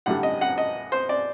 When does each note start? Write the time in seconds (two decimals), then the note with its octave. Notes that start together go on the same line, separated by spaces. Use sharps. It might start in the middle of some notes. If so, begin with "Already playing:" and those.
0.06 A1 G2 D3 G3 F#5
0.23 D#5
0.41 F#5
0.58 D#5
0.92 C5
1.09 D5